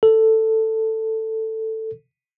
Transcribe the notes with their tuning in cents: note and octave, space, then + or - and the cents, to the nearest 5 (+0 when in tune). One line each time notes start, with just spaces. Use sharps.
A4 +10